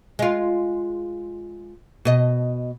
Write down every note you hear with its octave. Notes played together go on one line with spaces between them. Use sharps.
G#3 F4
B2 D#5